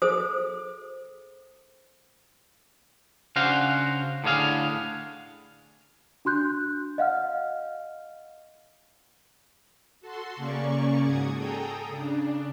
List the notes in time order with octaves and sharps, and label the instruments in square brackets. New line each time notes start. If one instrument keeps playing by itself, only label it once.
[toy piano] G#4 A4 C5 D#6
[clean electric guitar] C#3 D4 F#4 C5 F5
A2 D3 D4 G#4 F5
[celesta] D4 F#4 C6 F#6 G6
D#5 F5 F#5 F6
[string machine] F#4 A4 C6
C#3 A#3 C#4 D5 C#6
G#2 F#4 D#6 G#6
G#4 A4 G5 A#5 D#6
C#3 D4